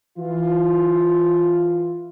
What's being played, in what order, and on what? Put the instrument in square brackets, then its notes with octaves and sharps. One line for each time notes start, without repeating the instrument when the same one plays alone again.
[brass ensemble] E3 F4